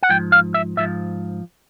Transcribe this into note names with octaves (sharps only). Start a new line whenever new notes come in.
F#5
G#2 F3 G5
F5
E5
G#2 F3 E5